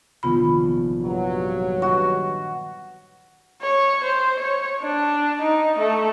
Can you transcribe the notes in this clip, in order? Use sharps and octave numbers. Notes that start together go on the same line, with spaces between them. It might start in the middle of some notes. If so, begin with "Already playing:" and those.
F1 A#1 D#3 B3 F4 B5
G2 F#3
F#4 B4 D#5 E5
C#5
C5
C#5
D4
D#4
A3